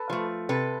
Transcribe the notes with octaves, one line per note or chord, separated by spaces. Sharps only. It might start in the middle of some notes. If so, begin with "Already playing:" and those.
Already playing: A4 B4
F3 A3
C3 A4 B4